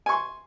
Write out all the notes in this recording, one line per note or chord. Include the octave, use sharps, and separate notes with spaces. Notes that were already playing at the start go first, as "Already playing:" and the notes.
G#5 C6 C#6